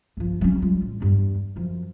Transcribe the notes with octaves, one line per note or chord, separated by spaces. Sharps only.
G1 F3
F#3 C#4
G3 F4
A1
E2 G2
F#2 F3